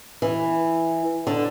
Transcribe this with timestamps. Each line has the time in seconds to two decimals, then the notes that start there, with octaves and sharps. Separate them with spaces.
0.22 E3
1.27 D3